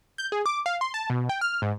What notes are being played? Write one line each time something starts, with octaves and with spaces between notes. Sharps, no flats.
G6
G#4
D6
F5
C6
A5
B2
G5
F6
G#2